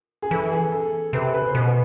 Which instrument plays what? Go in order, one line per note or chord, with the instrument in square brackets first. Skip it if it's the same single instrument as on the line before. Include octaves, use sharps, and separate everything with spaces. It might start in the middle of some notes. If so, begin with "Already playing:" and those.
[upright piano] G#4
[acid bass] E3 [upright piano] A4
[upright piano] G#4
A4
[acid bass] C3 [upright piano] B4
[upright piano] B4
C5
[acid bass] B2 [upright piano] B4
[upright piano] B4